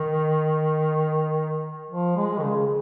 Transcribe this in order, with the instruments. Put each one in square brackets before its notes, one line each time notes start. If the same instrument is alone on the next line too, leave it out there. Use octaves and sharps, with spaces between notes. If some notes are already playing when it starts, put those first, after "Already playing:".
Already playing: [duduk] D#3
F3
G#3
D#3
C#3